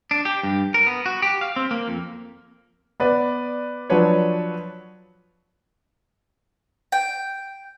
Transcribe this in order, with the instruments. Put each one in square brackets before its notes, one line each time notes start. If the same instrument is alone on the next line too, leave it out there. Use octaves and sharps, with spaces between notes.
[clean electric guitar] D4
G4
G2
A#4
B3
F#4
G4
F5
C4
A#3
F2
[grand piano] B3 B4 D5
F3 F#3 D4 B4 C#5
[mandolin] G5